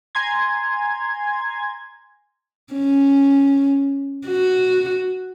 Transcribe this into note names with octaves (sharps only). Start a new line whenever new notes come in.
G#5 A#5 C6 G#6
C#4
F#4